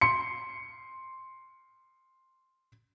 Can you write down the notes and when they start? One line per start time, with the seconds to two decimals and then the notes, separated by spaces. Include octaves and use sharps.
0.01 C6 C#7